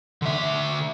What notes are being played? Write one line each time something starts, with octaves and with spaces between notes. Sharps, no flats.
D3 E5